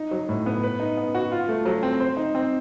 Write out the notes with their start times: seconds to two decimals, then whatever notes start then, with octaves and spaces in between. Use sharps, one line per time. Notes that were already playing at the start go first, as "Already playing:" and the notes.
Already playing: D#4
0.11 F#3
0.29 A2
0.46 B3
0.63 B4
0.80 D#4
0.97 B3
1.15 F#4
1.32 F4
1.49 A3
1.65 F#3
1.83 C4
2.00 C5
2.17 D#4
2.35 C4